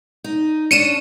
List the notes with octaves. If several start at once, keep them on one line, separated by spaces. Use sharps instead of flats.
D#4
C#4 D4 C#7 D#7 E7